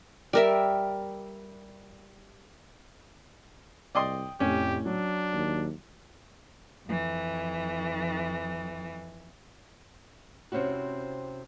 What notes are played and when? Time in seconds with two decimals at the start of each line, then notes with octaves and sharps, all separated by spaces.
0.33 G3 A#4 E5
3.95 C2 D5 D#5 G5 C6
4.40 F1 A2 C#4 G4
4.85 F#3 D4
5.33 D#2
6.86 F2 E3
10.52 C3 C4 C#4 E4 F#4